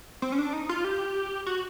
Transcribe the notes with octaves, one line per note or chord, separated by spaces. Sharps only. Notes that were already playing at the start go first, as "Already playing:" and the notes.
C4
C#4
D4
D#4
F4
G4
F#4